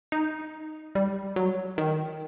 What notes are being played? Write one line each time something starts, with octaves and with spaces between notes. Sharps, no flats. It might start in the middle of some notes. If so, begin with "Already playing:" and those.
D#4
G3
F#3
D#3